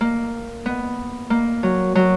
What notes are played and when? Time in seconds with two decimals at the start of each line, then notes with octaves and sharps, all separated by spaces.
0.01 A#3
0.66 B3
1.30 A#3
1.63 F#3
1.95 F#3